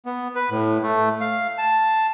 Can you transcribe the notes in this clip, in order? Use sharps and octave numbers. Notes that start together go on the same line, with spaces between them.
B3
B4
A2
A3
F5
A5